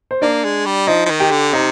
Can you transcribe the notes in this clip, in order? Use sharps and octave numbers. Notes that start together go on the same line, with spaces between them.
C5
A#3 D4 D5
G#3
G3
F3 D#4 D#5
F3
D#3
G4 G5
D3
C3 D#4 D#5